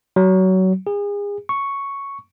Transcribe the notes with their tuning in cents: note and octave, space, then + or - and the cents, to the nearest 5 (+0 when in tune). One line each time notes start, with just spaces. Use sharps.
F#3 +20
G#4 -35
C#6 +0